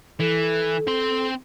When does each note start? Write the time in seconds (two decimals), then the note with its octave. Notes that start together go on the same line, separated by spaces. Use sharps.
0.19 E3 A4
0.87 C4 C6